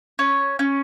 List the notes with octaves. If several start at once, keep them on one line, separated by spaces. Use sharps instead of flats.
C#4
C#4